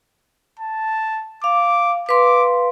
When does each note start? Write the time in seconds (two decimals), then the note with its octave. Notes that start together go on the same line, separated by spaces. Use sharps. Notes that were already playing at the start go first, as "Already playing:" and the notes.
0.59 A5
1.44 F5 D6
2.09 B4 F5 C6 D6